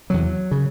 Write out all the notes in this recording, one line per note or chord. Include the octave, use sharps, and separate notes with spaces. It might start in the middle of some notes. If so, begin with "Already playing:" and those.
E2 C3 F#3
C#3